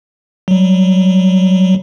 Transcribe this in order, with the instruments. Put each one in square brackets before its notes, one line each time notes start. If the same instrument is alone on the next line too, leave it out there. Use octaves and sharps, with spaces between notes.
[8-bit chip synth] F#3 G3